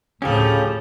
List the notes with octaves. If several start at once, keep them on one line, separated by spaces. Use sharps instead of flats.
D2 A2 C#3 F3 C#4 G4 A4